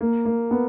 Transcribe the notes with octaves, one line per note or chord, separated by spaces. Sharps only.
A#3
A#3
B3